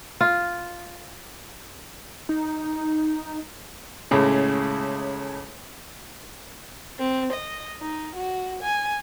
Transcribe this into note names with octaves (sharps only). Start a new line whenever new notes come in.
F4
D#4
C#2 A2 C#3 G#3
C4
D#5
D#4
F#4
G#5